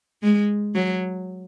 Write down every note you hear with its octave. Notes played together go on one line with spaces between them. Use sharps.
G#3
F#3